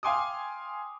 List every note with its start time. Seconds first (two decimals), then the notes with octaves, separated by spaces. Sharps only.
0.03 F5 G5 G#5 C6 D6 D#6